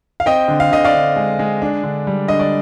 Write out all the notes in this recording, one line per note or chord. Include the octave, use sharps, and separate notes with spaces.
F5
C4 D#5 G5
D3
F5
D3 D#5
D5 F5
D3
G#3
G#3
D4
D3
G3
D3 D#5
D5